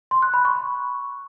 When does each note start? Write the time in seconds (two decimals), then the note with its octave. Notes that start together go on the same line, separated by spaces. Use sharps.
0.11 C6
0.22 F#6
0.34 B5
0.45 C#6